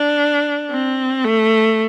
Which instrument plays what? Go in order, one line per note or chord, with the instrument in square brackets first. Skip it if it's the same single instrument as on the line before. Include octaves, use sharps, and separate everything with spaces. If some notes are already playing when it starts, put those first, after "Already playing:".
Already playing: [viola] D4
C4
A3